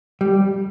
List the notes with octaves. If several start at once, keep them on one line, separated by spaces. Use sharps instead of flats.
G3